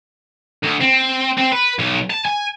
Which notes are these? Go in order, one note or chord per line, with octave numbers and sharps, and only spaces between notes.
D2
C4
C4
B4
B1
A5
G#5